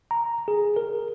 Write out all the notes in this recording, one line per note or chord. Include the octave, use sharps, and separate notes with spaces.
A#5
G#4
A#4